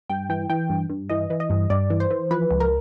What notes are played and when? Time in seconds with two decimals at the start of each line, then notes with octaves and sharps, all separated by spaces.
0.09 G2 G5
0.29 E3 G5
0.50 E3 G5
0.70 G2
0.90 G2
1.09 E3 D#5
1.30 E3
1.40 D#5
1.50 G2
1.70 G2 D5
1.90 E3
2.00 C5
2.11 E3
2.31 F3 B4
2.51 C#2
2.60 A#4